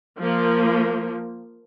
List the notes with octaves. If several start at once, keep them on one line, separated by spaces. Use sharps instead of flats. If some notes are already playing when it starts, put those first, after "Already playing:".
F3 A#3